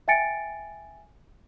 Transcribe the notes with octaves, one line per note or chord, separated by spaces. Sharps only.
E5 G5 G#5 A6 C#7 D7